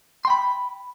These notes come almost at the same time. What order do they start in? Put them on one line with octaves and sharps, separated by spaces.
C6 G5 B5